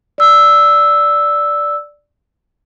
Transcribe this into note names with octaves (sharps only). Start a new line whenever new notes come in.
D5 E6